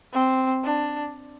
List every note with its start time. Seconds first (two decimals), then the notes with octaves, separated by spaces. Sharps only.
0.13 C4
0.64 D4